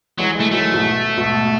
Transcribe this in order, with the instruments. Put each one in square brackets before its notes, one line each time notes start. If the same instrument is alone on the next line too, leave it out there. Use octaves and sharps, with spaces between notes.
[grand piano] E3 G#3 [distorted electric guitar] F#3
[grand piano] E3 G#3
[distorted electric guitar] A3
[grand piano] D#3 F#3 [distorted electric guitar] A3
[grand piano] G#2 B2
G#2 B2